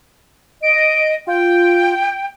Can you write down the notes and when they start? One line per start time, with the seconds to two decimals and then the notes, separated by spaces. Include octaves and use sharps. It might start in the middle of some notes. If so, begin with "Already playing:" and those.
0.63 D#5 D7
1.27 F4 G5